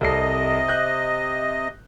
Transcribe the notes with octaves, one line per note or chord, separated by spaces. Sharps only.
C2 C3 A4 D#5 C7
F#6 G6